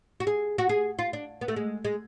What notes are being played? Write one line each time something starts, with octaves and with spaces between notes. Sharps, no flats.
F#4
G#4
F#4
G#4
F4
D4
B3
A3
G#3
G#3